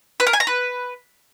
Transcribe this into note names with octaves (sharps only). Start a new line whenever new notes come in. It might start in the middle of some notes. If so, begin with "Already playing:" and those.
B4
A#4
G#5
A#5
B4